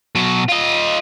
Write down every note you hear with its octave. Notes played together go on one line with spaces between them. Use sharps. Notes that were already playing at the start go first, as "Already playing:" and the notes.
B2 F#3
F4 D#5